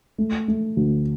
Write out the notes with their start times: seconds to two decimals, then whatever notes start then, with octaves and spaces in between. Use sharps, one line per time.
0.18 A3
0.48 A3
0.77 D2